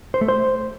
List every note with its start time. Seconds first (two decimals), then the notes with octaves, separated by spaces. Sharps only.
0.14 C5
0.21 A3
0.28 C5